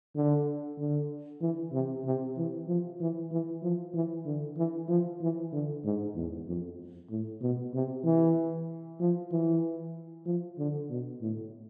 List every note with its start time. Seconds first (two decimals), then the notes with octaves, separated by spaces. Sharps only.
0.16 D3
0.79 D3
1.41 E3
1.73 C3
2.05 C3
2.37 E3
2.68 F3
3.00 E3
3.31 E3
3.63 F3
3.94 E3
4.26 D3
4.57 E3
4.89 F3
5.21 E3
5.52 D3
5.84 G#2
6.16 E2
6.47 F2
7.10 A2
7.41 B2
7.74 C3
8.04 E3
9.00 F3
9.31 E3
10.26 F3
10.58 D3
10.89 B2
11.21 A2